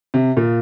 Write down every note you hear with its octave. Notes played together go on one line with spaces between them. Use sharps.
C3
A#2